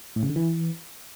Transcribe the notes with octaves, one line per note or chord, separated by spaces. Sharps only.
A2
C#3
D3
E3